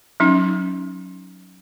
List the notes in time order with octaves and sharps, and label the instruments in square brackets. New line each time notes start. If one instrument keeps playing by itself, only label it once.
[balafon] F#3 C#4 D#4